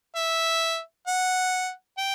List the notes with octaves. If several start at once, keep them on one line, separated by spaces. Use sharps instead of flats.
E5
F#5
G5